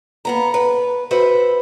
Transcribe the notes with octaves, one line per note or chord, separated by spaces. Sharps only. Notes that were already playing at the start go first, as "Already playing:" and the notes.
A#3 B3 A#5
B4
F#4 B4 C5 E5